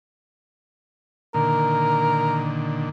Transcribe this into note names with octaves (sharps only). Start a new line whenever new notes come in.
A#2 D3 D#3 A#4